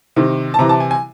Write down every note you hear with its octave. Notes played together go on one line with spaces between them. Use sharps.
C3 D#3
A5
C3 E3 A#5
A5
G#5
G#5